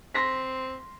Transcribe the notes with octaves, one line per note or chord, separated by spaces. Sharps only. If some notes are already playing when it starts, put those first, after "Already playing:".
C4 C6 A#6 B6